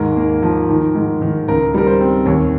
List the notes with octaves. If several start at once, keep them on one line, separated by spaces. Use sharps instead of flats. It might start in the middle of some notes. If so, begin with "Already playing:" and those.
Already playing: D#2 G#2 A#4
A#3
F3
D#3
G#2
D#3
C#2 A#4
G3 A#4
C5
C4
D#2 C#5